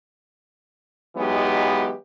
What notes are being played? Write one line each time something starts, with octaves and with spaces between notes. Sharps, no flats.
E3 F#3 G#3 B3 D#4 G4